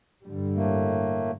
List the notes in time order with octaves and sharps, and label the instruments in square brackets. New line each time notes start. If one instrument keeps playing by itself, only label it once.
[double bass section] G2 D3 G3
[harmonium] A2 A3 A#3